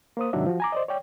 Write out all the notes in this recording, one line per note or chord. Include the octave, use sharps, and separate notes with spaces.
A#3 C5 D#6
G#2 C3 D#3 F#3 D4 E5
F3 F#4
G#5 A#5 D6
C5 D5 D#5
C#5 D5 G5